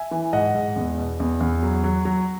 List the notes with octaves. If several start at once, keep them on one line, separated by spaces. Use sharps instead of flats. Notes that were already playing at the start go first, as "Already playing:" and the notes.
Already playing: E5 G#5
E3
G#2 D#5 F#5
G#2
E2
B2
E2
E2
F#3
F#3
F#3